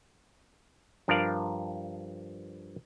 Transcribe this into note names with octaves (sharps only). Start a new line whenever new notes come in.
G2 F3 D4 A#4 D5 F5